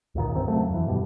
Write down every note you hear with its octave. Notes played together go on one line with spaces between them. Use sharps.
C#2 F#2 A#2 D#3
E2 G2 C3 C4
C#3 F#3 A3
F2 E3
G2 B2 G3